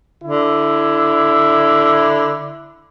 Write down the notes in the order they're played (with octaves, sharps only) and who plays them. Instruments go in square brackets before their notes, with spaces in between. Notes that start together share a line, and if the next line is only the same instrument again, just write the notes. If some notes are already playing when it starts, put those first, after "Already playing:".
[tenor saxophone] D3 [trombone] E4